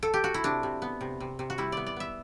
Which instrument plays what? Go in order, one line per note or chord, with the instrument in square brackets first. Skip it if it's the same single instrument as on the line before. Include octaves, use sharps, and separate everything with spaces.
[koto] A4
G4
F#4
E4
C3 D4
C3
B3
C3
C3
C3
F#4
G3 E4
B3 D5
D5
B3 E5